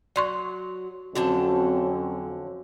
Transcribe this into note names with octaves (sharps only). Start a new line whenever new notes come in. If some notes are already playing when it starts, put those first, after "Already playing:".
F#3 D5 C6 C#6
F2 D3 F#3 C4 C#4 F#4 A5